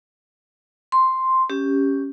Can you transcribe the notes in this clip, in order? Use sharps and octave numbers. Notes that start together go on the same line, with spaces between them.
C6
C#4 G4